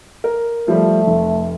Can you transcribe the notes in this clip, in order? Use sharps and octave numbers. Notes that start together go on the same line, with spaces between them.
A#4
F3 G3 A3
F1